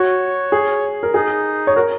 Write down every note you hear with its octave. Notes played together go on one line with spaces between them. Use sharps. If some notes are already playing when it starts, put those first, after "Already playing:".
Already playing: F#4 C#5
G#4
A#4
D#4 G#4
C#5
F#4 A#4